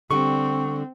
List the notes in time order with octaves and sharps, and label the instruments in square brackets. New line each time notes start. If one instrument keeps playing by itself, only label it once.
[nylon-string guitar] D3 G3 [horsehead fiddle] C4 [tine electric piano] C#6